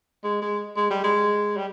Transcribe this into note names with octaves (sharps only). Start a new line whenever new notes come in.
G#3
G#3
G#3
G3
G#3
G3